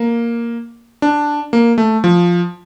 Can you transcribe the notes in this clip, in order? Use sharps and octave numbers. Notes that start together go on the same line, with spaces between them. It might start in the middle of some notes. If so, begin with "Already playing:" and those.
Already playing: A#3
D4
A#3
A3
F3